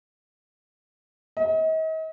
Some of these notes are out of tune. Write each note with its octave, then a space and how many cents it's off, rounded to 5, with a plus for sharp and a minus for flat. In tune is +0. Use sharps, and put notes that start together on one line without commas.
D#5 +40